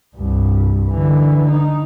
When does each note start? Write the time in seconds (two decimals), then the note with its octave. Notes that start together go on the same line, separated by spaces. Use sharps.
0.16 C2 G2
0.88 D3 E3
1.48 D#4